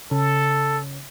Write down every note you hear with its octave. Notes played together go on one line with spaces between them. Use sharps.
C#3 A4